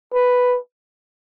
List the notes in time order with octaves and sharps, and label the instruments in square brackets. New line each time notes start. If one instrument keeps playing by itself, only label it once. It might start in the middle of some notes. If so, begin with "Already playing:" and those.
[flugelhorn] B4